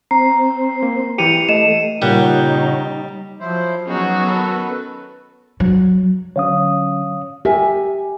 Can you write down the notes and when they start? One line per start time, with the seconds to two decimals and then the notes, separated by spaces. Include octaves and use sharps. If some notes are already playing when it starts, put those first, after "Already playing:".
0.11 C4 A#5 C7
0.83 A#3
1.18 E3 G4 C#7 D#7 F7
1.49 A3 D#5 E7
2.02 A#2 C#3 G3 D#4 C#5 F#5 G6
3.40 F3 F#3 E4 C5
3.87 F#3 B3 C#4 D#4 F#4 G#4
4.26 D#3 A4 B4
5.60 F#3
6.36 D3 F#3 C#4 C#5 F5 D#6
7.45 G4 A#4 E5 G#5